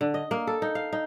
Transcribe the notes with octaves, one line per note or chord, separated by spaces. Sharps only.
D3
D#5
A#3
A4
D#4
F5
D#4